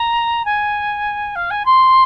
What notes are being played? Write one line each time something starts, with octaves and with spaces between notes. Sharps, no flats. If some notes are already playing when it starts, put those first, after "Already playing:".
Already playing: A#5
G#5
F5
G#5
C6